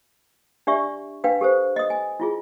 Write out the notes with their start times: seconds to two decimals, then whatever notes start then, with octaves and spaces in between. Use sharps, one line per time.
0.67 D4 G4 D5 E5 C#6
1.24 D4 B4 F5 G5
1.41 G4 A4 B4 C5
1.76 D#5 D#6
1.90 G#5
2.20 E4 F4 G#4